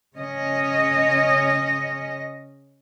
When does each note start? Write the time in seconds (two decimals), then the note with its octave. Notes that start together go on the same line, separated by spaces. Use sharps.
0.16 C#3 C#4 D#5